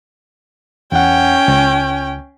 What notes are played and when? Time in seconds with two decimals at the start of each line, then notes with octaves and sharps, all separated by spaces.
0.92 E2 C#4 F#5 G5
1.48 C#2